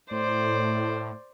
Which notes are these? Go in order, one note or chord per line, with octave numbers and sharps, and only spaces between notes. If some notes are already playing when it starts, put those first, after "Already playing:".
A2 C5 D5